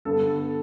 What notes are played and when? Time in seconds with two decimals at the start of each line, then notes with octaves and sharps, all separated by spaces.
0.05 G2 D3 G3 B3 A4